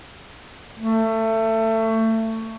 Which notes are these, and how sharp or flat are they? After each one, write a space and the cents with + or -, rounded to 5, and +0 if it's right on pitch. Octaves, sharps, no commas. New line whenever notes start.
A3 +25